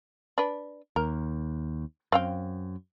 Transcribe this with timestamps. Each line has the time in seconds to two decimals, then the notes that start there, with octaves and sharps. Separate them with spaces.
0.38 D4 B4
0.96 D#2 A#4
2.12 F#2 C4 F5 G5